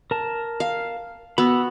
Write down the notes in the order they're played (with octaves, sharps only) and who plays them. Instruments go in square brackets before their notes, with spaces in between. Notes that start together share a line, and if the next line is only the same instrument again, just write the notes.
[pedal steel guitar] A#4 A5
[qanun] F5
[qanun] B3 F#4 [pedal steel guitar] B5 E6